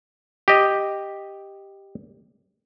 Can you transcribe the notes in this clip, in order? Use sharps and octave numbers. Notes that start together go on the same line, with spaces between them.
G4 D#5